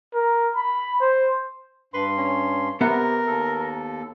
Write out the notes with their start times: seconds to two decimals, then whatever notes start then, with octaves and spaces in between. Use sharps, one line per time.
0.14 A#4
0.55 B5
1.01 C5
1.94 G2 B4 C6
2.18 C#4
2.81 C3 B3 A#4 E5 F#5
3.27 D#2 A4